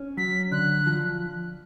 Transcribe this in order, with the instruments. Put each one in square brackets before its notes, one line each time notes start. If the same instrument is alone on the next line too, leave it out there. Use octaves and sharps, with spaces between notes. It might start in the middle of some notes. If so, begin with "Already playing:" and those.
Already playing: [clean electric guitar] C#4
[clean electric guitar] F#3 [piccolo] B6
[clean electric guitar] D3 [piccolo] F#6
[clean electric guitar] F3